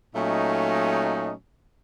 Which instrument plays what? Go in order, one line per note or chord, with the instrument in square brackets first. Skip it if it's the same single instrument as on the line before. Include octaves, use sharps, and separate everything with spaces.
[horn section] A#2 F#3 A3 C#4 D#4